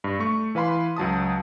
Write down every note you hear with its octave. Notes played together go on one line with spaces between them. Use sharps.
G2
A3 C#6
E3 B4 F5 B5 C6
C#2 F#3 A5 D#6